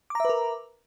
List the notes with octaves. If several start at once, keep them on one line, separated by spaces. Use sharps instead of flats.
A#4 B4 E5 A#5 D6